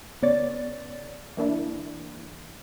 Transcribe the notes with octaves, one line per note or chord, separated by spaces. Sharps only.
C#3 B3 C#5 D5 A6
E3 A#3 D4 E4